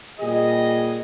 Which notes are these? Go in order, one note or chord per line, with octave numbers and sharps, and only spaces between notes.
A#2 G3 G#4 D#5